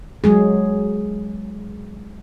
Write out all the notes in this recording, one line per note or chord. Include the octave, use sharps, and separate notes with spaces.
F#3 G#3 G#4